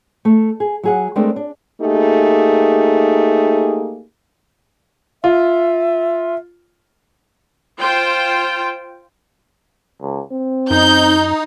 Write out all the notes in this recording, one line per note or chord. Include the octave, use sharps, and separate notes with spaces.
A3
G#4
F#3 G#4 F#5
G#3 A3 C4 D4 A#4
D4
A3 A#3 D#4 G4 G#4
F4 E5
F4 C5 G5
C#2
C4
F#2 D#4 G6